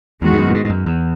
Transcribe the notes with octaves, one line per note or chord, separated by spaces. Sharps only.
E2 D#3 G#3 B3 F#4
G#2
F#2
A2
G#2
G#2
F#2
E2